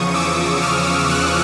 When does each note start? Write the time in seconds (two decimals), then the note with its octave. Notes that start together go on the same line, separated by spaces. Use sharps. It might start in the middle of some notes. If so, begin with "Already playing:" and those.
Already playing: E2 C#3 F3 C#6 D#6
0.14 D6 E6
0.62 D#6 F6
1.09 E6 F#6